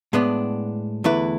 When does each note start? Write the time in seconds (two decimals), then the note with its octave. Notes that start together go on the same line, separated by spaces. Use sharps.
0.13 A2 G#3 B3 D4
1.04 E2 D3 A3 E4 B4